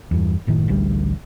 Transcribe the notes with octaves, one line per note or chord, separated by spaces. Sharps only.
E2 G2
F#1 A2 D#3
A1 D2 D#3 G3